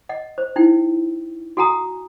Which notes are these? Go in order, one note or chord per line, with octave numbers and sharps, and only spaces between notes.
D#5 F#5
C5
D#4 E4 G5
F#4 A4 F#5 G#5 A#5 D#6